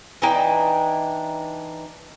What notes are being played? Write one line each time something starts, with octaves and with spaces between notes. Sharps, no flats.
E3 D4 D#4 G5